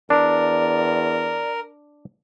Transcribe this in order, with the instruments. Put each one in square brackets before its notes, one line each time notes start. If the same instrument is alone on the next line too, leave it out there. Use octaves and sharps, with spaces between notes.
[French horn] E2 [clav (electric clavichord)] D4 [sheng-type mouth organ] A#4 [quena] D5